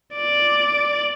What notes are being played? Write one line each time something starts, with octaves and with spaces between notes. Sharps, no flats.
D5